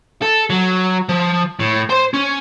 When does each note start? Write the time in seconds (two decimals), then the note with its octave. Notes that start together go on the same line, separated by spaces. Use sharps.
0.22 A4
0.50 F#3
1.09 F3
1.60 A2
1.90 C5 C6
2.14 C#4